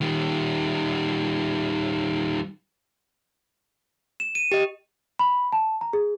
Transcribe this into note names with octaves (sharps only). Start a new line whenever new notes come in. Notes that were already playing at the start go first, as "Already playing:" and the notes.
D#3 G3
E7
D#7
G4 D#5
B5
A5
A#5
G#4